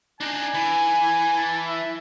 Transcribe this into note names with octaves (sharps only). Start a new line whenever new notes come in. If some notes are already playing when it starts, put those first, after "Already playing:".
D4 D#4 G#5
E3
A5
E5